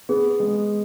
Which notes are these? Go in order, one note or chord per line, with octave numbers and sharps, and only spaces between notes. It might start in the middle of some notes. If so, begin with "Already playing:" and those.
B3 G#4
G#3